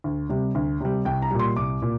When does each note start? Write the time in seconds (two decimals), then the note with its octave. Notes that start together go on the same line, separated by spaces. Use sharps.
0.04 D2
0.29 C3 G3
0.55 D2
0.81 C3 G3
1.05 C2 G5
1.22 A#5
1.31 A#2 G3
1.39 C6
1.56 C2 D6
1.82 A#2